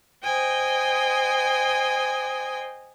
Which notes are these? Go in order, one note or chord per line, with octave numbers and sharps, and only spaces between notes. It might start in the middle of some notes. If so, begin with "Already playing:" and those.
C5 D#5 G5 G#5